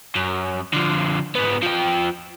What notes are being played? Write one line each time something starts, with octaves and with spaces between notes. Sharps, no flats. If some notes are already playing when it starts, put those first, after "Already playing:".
F#2
D3 F3
G#2 B3
F3 G5